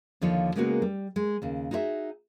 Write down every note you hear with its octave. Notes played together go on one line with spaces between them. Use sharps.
D#2 D3 F3 D#4 F4 C#5
C#3 G#3 A#3 B3 F#4 A#4
G3
G#3
D#2 C#3
D#4 F#4 G#4 C5 E5